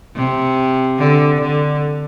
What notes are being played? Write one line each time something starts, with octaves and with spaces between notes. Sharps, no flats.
C3
D3
D3